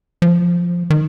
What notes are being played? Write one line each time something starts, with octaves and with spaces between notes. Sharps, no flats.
F3
D#3